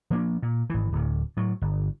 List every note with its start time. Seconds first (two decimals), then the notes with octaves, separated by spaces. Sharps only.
0.10 F3 A#3 D4
0.42 A#2
0.70 G#1 E3
0.92 D1 D2
1.37 A2 F#3
1.62 G1